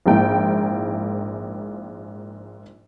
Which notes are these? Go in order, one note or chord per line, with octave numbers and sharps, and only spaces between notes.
A#1 G#2 A#3 E4 G5